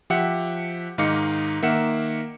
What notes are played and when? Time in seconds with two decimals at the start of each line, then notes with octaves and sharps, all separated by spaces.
0.10 F3 G4 E5 F#5 C#7
0.98 G#2 D#3 D#4 F5 D6 C#7
1.62 D#3 A#3 E5 F#5 C#7 E7